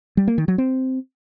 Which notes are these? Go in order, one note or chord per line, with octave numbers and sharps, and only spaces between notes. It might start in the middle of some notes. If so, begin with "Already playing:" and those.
G3
A#3
D#3
F#3
C4